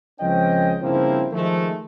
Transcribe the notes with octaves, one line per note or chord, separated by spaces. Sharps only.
C#2 F3 C4 C#4 D#5 G5
G2 C#3 F3 A#3 C4 E4
D#3 F3 G#3 A3